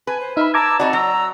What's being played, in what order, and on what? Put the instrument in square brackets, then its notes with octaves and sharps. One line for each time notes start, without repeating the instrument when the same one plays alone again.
[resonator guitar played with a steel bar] B4 [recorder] G#5
[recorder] C5
[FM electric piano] D#4 B5 [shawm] E5 [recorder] F6
[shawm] A5 [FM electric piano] A#5 D6 G#6 [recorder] E6
[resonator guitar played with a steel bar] C4 D#4 F#4 [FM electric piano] D5 [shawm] A5 [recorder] B5
[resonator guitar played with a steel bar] F#3 [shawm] A#5 [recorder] E6